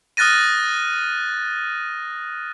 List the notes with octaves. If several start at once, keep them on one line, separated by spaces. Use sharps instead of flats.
D#6 F6 F#6 A6 A#6 D#7